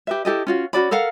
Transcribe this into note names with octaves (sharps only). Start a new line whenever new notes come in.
G4 B4 E5
E4 G4 A4 D#5
C#4 F4 F#4
C#4 F#4 D5 B5
A4 A#4 F5 F#5